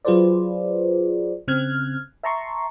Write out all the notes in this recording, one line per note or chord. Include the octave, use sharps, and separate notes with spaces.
F#3 F4 G#4 B4 C5 D5
C#3 C4 F6 F#6 G#6
E5 A5 A#5 C6 C#6